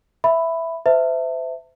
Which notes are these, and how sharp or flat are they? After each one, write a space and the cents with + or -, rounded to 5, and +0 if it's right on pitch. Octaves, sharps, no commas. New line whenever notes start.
E5 +0 B5 +5
C5 -40 E5 +0 A5 +40